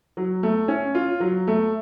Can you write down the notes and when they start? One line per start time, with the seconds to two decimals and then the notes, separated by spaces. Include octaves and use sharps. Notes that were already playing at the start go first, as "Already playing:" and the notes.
0.17 F#3
0.43 A3
0.68 C#4
0.95 F4
1.20 F#3
1.47 A3